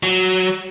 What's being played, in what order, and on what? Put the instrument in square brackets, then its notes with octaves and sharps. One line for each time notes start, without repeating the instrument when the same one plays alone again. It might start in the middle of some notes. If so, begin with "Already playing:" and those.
[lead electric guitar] F#3